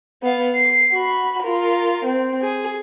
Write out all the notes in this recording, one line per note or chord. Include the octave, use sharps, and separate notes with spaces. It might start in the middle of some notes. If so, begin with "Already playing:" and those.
B3 F5
C7
F#4 B5
F4 A#4
C4
G#4